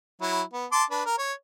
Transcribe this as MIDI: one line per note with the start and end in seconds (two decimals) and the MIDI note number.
0.21 0.42 54
0.21 0.42 64
0.53 0.66 59
0.72 0.84 81
0.72 0.84 84
0.72 0.84 86
0.91 1.03 62
0.91 1.03 71
1.06 1.15 70
1.18 1.32 73